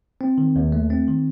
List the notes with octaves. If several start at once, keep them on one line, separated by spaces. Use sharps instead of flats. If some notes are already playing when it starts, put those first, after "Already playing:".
C4
D#3
D#2
A3
C4
D#3